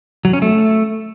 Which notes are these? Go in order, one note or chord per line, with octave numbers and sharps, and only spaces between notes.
F#3
C#4
A3